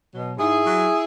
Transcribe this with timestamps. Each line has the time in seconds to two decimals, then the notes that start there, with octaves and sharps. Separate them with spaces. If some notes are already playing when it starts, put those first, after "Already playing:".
0.12 B2 F#3
0.38 G#2 E4 G#4
0.65 F#3